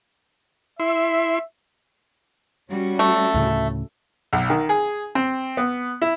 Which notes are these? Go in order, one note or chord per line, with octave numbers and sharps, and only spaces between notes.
E4 E5 C6
G3 C#4 F#4
A3
D2 A2 C#3
B1
D#3
G#4
C4
B3
E4